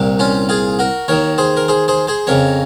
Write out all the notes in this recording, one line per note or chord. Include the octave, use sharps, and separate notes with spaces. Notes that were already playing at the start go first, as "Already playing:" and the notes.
Already playing: C2 A#2
C#4 F4
F4 G#4
F#4 A#4
D#2 D#3 A#4 C#5
G#4 C5
A#4
G#4 C5
G#4 C5
G#4 C5
F2 C#3 A#4 C#5